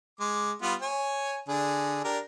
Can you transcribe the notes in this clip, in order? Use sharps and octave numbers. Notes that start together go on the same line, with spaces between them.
G#3 D6
G3 B3 F4
C#5 G#5
D3 D4 G#4
D4 G4 A#4